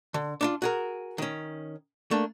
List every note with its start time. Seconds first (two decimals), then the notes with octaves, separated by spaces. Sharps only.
0.14 D3
0.41 D4 D#4 F4
0.62 F#4 G#4 A#4
1.18 D#3 C#4
2.11 A3 A#3 D4